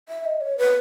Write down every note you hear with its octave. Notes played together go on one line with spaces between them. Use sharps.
E5
D#5
C#5
B4